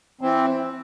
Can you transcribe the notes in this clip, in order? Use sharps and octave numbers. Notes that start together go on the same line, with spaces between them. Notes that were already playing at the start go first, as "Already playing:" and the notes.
E3 C4